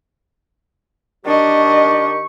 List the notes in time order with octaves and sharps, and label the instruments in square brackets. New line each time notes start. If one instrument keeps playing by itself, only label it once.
[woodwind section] D#3 G4 C#6 [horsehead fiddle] D4 D#5